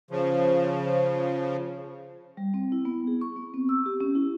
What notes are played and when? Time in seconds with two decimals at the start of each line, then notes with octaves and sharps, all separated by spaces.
0.11 C#3 F3
2.37 G3
2.54 C4
2.72 E4
2.85 B3
3.07 G#4
3.21 C#6
3.36 B3
3.54 C4
3.69 E6
3.86 G4
4.01 C#4
4.15 E4